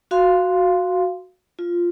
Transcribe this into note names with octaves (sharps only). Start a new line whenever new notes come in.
F#4 F5 C6
F4